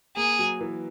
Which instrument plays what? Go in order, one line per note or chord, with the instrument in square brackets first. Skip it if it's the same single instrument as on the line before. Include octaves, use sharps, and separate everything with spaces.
[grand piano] A#3 [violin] G#4
[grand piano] F#3
E3